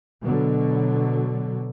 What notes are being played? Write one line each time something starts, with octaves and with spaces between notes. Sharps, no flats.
B2 D3 F#3